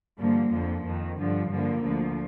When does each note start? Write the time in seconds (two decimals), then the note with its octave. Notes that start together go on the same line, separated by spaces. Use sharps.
0.18 G2 D3 F3 A#3
0.52 F2 D3 F3
0.85 F2 D#3
1.18 G2 D3 F3
1.51 G2 D3 F3 A#3
1.84 D2 D3 F3